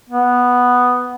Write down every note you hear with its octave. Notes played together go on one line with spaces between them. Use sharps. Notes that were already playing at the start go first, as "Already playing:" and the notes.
B3